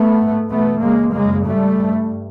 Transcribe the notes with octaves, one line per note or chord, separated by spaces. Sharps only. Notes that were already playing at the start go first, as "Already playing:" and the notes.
Already playing: A3 B3
G#2
E2 B2 A3 B3
E2 C#3 G#3 A#3
F#2 C#3 G#3 A#3
G#2 G3 A3
G2